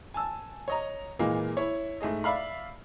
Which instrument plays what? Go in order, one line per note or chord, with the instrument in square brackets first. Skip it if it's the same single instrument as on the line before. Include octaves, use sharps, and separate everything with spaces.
[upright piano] G#5 A5 E6
C#5 D#5 A#5
A#2 E3 G#3 A#3
E4 C#5
G#2 A3 G#4 D#5
D5 E5 F5 B5